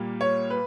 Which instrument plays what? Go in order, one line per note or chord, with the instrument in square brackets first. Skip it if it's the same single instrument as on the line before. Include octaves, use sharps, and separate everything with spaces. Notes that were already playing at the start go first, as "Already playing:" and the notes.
Already playing: [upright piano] A#2 G3 A#3
C#5
B4